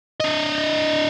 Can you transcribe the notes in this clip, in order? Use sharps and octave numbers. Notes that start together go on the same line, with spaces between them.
D4 D#5